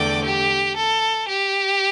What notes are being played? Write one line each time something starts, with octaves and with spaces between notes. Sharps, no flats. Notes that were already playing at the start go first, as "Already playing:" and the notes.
Already playing: E2 D3 A3 D5 G5
G4
A4
G4